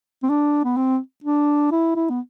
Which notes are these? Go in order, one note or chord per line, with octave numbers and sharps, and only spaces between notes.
C4
D4
B3
C4
D4
E4
E4
B3